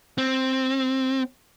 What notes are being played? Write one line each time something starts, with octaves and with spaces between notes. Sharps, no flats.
C4